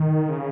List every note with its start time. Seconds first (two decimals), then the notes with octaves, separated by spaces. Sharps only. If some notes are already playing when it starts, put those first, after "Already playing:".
Already playing: D#3
0.29 C#3